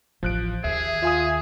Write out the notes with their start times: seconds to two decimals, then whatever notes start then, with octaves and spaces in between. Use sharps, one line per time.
0.23 A1 F3 F#6 D7
0.64 D#2 G#4 E5
1.03 F4 E5 G#5 D#6